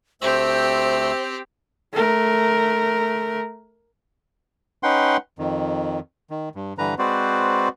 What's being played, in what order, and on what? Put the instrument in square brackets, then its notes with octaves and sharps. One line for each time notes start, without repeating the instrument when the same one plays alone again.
[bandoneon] D2 A3 E6 [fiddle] C4 G4 [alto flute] C5
[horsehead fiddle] A3 A#4
[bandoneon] C#4 D#4 B4 F#5 G5 C6
F2 D#3
D#3
G2
G2 D3 E3 B4 A#5
G#3 C4 F#4 B4 C5 D5